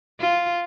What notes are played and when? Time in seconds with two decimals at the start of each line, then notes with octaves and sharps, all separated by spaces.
0.20 F4